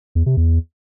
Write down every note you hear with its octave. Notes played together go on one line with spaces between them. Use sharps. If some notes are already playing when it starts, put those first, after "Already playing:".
E2
C3
E2